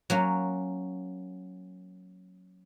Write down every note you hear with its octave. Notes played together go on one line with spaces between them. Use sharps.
F#3 A#3 C#4